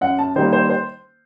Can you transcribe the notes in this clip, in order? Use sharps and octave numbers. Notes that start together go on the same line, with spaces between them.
F#2 F#5
A5
D#3 G3 A#3 C5
C5
C5